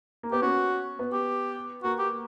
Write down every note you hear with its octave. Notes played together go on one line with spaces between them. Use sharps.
A#3
B3 G4
C#4 F#4
B3
G4
A#3 F#4
G4